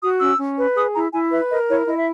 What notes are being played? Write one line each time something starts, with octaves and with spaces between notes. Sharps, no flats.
F#4 D#6
C#4 E6
C#4
B4
G#4 D#6
E4 A#5
E4 G#5
B4 E5
A#4 D#5
E4 C#5
E4 D#5
E5